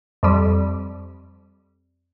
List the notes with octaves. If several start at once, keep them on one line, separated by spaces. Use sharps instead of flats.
F2 G3